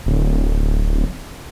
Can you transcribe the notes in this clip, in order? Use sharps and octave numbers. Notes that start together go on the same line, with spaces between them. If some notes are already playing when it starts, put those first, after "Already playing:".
D1